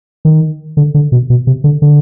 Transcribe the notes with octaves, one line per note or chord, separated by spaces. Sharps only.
D#3
D3
D3
B2
B2
C3
D3
D3